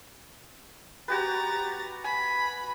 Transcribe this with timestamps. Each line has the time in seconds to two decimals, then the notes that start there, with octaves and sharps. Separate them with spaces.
1.08 F#4 G4 B4 A#5 A6
2.04 G#5 B5